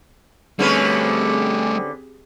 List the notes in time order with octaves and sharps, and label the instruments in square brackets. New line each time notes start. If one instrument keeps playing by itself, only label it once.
[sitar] D3 C#4 B4 [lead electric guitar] G3 A3 [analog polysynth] C4 G4 G#4